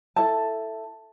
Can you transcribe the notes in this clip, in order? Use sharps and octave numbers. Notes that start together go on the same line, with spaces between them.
E4 A4 A5